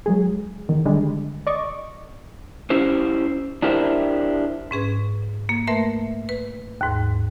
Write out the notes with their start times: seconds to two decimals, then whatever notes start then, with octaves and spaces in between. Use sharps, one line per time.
0.06 F#3 G#3 G#4
0.69 E2 D#3
0.85 D3 G3 G#3 D4
1.47 D5 D#5 C#6 D6
2.70 C#4 E4 G4 C5
3.62 D4 E4 G4 A#4 C5 E5
4.71 G#2 C#4 G#4 B4
5.49 A#3
5.67 A3 A#4 B4 E5 C6
6.29 B4
6.81 D#2 G#2